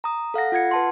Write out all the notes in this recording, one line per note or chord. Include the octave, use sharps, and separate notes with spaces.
A#5 D#6
A4 F5 F#5 A#6
F4 F#5 G#6 C#7
B4 A5 C6